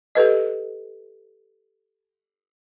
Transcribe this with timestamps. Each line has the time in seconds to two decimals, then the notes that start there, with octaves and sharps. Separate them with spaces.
0.15 G4 A4 B4 D#5